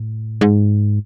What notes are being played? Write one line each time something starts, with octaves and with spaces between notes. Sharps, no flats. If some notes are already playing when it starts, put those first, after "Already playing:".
Already playing: A2
G#2